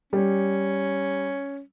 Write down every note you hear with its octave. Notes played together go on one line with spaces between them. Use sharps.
G3 C#4